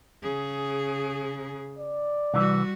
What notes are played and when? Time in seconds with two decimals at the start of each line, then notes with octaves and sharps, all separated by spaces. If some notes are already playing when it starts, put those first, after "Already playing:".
0.23 C#3 G#4
1.79 D5
2.34 C2 E3 G3 F#4